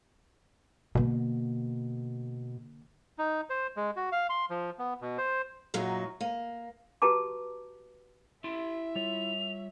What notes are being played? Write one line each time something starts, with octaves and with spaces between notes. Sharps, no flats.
B2 D3 A#3
D#4
C5
G#3
F#4
F5
C6
F3
B3
B2
C5
F#2 A#2 F#3 D#4 F#4
A#3
F#4 G4 B4 A5 A#5 D6
E4 E5 C6
G3 F4 C#5 F7